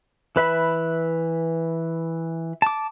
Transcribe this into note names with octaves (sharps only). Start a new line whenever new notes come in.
E3 B4 E5 B5
A5 D6